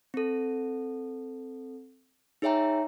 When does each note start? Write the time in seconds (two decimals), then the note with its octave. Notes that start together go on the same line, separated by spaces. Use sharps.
0.14 C4 A4
2.42 D#4 G#4 C#5 E5 G5 A#5